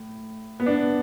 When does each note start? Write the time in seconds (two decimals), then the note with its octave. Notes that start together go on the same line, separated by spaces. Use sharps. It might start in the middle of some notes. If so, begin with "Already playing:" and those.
Already playing: A2
0.60 B3
0.66 D4